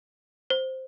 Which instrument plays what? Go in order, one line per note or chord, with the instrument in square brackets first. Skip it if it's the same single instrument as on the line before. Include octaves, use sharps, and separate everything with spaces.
[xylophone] C5